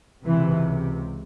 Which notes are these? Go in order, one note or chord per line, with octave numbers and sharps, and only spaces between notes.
C#2 C3 E3